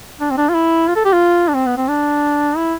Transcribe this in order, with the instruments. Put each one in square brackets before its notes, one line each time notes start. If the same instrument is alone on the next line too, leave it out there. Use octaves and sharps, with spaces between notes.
[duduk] D4
C4
D4
F4
E4
F4
A4
G4
F4
D4
C4
B3
C4
D4
E4